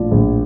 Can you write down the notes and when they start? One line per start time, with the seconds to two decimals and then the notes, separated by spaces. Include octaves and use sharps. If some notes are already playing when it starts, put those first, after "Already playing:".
Already playing: A#1 A2 F3 D5
0.11 A#1